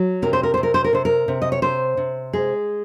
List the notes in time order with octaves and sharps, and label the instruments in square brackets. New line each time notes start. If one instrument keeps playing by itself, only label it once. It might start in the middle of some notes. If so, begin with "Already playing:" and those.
Already playing: [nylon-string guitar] F#3
C3 A#4
C5
A#4
C3 C5
A#4
C5
A#4
C3 C5
A#4
C3
D#5
C#5
C3 C5
C3
G#3 G#4